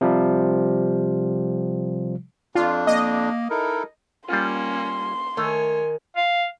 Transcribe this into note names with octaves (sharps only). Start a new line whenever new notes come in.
C3 F3 G3
F2 D4 F4
A#3 D#5
D#4 E4 A4 A#4
G3 A#3 C#4 F4 C6
D#3 A3 C#5 G#5
F5